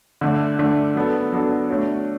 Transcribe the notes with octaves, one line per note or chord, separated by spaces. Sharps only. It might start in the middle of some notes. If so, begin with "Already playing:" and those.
D3 A3 D4
D3 A3 D4
F#3 B3 D4 A4
F#3 B3 D4 A4
A3 D4 F#4 C#5